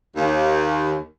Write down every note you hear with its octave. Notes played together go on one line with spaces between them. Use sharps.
D#2